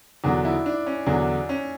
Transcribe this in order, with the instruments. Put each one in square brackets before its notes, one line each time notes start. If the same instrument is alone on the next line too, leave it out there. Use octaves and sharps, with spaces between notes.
[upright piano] E2 D3 F#3 [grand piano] D4
[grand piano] E4
D4
C#4
[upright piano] E2 D3 F#3 [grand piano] D4
[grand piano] C#4